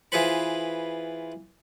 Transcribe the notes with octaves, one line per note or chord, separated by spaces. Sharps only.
E3 F4 G#4 B4 C5 B5